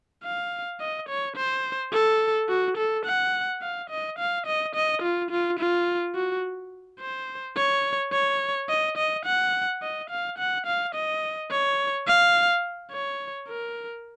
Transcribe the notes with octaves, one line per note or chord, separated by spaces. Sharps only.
F5
D#5
C#5
C5
A4
F#4
A4
F#5
F5
D#5
F5
D#5
D#5
F4
F4
F4
F#4
C5
C#5
C#5
D#5
D#5
F#5
D#5
F5
F#5
F5
D#5
C#5
F5
C#5
A#4